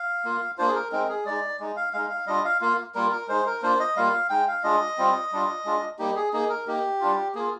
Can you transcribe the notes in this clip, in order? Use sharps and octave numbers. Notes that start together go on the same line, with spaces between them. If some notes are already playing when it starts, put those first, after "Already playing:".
Already playing: F5
A#3 F4
A#3 D4 F4 C5
G#4
A#4
G#3 C4 D#4 A#4
G#4
G#3 D#4 D5
G#3 D#4
F5
G#3 D#4 F5
F5
G3 D4 F4 D#5
F5
A#3 F4 F5
G3 A#3 F4 A#4
A#4
G#3 D#4 C5
A#4
A#3 D4 F4 C5
D#5
G3 A#3 F4 F5
G#3 D#4 G5
F5
G#3 D4 F4 D#5
G3 C4 F4
G3 D4 F4
G#3 D4 F4
G3 A#3 D#4 G4
G#4
A#3 D#4 G#4
A#4
A#3 D#4 G4
G3 D4 F4
A#3 F4 G#4